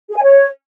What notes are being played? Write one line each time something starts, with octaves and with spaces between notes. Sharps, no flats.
G#4
G#5
C#5